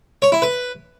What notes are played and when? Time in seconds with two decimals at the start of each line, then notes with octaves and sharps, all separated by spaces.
0.22 C#5
0.32 E4
0.42 B4